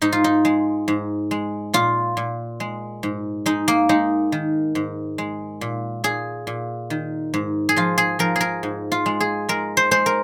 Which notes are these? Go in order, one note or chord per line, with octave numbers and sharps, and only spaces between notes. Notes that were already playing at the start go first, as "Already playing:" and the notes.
G#2 D#4
F4
D#4
G#3
G#2
G#3
A#2 F4
A#2
G#3
G#2
G#3 D#4
A#3
G#3 D#4
D#3
G#2
G#3
A#2
A#2 G#4
A#2
D#3
G#2
G#4
F3 F4
G#4
F3 A#4
G#4 A#4
G#2
F4
G#3
G#4
G#3 A#4
C5
G#3 C5
A#4